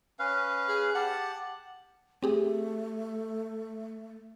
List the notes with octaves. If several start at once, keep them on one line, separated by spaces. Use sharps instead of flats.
C#4 B4 F5
G#4
G4 F#5 A5
A3 C4 G4 G#4